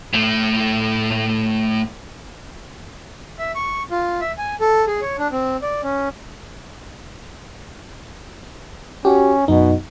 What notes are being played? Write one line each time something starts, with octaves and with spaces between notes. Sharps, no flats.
A2 A3
E5
C#6
F4
E5
G#5
A4
G#4
C#5
D4
C4
D5
C#4
C#4 F#4 G4
F#2 B2 D#4